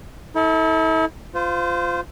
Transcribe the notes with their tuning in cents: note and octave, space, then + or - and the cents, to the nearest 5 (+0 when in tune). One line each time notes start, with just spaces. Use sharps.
E4 -40 A4 +0
F4 +0 C5 -30